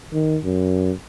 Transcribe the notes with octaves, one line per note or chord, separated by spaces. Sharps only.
D#3
F#2